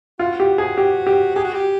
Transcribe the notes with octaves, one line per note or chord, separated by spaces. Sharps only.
F4 F#4
G4
G#4
G4
G4
G4 G#4
F#4
G4